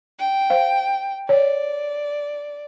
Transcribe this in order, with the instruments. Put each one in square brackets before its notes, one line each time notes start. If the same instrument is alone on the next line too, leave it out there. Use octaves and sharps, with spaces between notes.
[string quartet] G5
[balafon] C5 F5
[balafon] C#5 [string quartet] D5